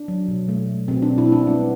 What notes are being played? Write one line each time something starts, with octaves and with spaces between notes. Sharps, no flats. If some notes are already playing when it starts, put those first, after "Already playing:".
Already playing: D4
F#3
B2
A3
B2
B2 C4
B2 D4
E4
A3 D4
G3 B3